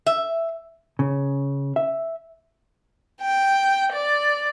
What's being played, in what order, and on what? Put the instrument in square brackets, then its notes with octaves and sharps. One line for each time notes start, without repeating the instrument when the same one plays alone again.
[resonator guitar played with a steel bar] E5
[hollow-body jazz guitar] C#3
E5
[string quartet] G5
D5